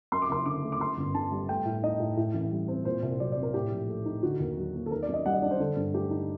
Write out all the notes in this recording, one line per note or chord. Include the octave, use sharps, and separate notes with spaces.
F#2 C6
D6
F#1 C6
D3 D6
A3
D6
F#2 C6
G1
D3 A5
G3
A3 G5
A2
D#4 D#5
A2
A2
A1
G3
C4
A#2 C5
C2
F#3 D5
D5
C4
A#4
A2 G4
A#1
A3
D#4
D3 F#4
D#2
F#3
A#3
A4
D#3 A#4
D5
F#2
D#5
G3 F#5
D#5
D4 D5
C5
D3 A4
G2
A3 G4
D#4